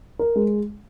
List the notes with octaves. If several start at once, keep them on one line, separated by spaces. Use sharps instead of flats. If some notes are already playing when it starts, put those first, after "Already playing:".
A#4
G#3